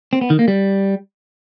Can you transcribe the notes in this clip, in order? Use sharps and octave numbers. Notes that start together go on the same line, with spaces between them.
C4
B3
D#3
A#3
G3